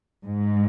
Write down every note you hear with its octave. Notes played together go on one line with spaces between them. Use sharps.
G#2